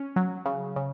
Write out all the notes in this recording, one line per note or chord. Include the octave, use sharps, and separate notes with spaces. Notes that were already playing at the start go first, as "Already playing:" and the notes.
Already playing: C#4
F#3
C#3
C#3